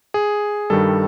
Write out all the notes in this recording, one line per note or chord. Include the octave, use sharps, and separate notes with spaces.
G#4
G2 D#3 G3 A4